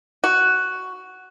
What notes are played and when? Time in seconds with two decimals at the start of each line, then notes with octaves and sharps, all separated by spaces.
0.24 F#4